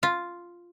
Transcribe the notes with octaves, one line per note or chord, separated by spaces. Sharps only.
F4